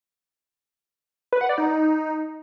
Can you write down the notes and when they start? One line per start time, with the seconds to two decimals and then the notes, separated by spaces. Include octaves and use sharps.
1.33 B4
1.41 F#5
1.49 D5
1.58 D#4